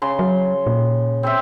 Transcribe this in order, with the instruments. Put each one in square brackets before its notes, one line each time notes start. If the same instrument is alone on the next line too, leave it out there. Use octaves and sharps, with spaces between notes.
[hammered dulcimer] C#3 C6
[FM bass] F#3
A#2
[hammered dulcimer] C4 C5 E5